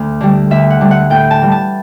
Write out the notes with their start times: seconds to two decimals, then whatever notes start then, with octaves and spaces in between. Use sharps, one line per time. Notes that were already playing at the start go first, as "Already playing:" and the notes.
Already playing: D2
0.21 D3 G3
0.51 D2 E5
0.70 F#5
0.81 D3 G3
0.91 F#5
1.10 A2 G5
1.31 A5
1.42 E3 G3
1.52 A5